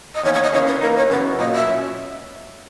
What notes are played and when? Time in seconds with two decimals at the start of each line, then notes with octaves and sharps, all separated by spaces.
0.14 D#5
0.23 E2 D#3 A#3 C#5
0.34 C#5
0.43 D#5
0.52 C#3 E3 A#3 C#4 G#4 C#5
0.66 B4
0.81 E3 A#3 D#4 A#4
0.96 C#5
1.10 F#2 C#3 E3 B3 F#4 B4
1.39 A#2 F#3 A#3 D#5
1.55 E5
1.68 F#3 C#4